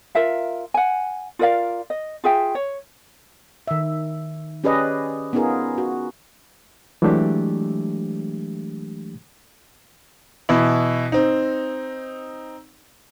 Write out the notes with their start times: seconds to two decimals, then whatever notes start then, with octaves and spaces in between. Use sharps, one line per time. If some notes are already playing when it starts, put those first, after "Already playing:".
0.15 F4 A#4 E5 F5
0.74 F#5 G#5
1.39 F4 A#4 D5 F5
1.90 D#5
2.24 F4 G#4 E5 G5
2.55 C#5
3.67 D#3 E5
4.64 C#4 G4 G#4 B4 D5 D#5
5.33 B3 C#4 D#4 F4 G#4 A#4
5.78 F#4
7.02 E3 F#3 G#3 A3 D4 G4
10.49 B2 E3 E4
11.12 C4 D#4